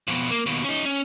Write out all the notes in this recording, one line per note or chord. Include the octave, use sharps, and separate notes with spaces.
F2 B2
A#3
D#2 B2
C#4 D#4
C#4